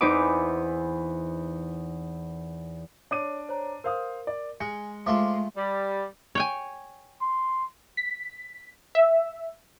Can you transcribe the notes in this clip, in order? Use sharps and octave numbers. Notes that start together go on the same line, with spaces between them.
E2 E3 C4 D#4 B4 D6
D4 C#5 D6 D#7
C5 C#5 A#5
A#4 C5 F5 D#6
D5
G#3 G#5 C#7
G#3 A3 F4 A4 C5 D6
G3
C#5 G5 G#5
C6
B6
E5